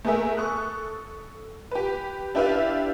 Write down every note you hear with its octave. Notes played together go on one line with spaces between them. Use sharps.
A3 B3 G#4 A#4 E5
A4 C#6 D#6 F#6
G4 B4
D4 E4 G4 B4 E5 F5